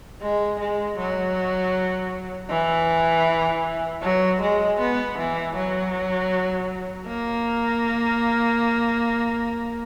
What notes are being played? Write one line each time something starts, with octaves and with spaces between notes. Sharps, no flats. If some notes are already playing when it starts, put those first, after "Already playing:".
G#3
G#3
F#3
E3
F#3
G#3
B3
E3
F#3
A#3